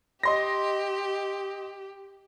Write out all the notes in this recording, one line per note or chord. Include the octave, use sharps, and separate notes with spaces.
G4 D#5 C6 A#6